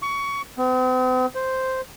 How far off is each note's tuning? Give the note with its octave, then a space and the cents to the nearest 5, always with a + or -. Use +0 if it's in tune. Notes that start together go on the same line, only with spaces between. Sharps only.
C#6 +20
C4 -45
C5 -5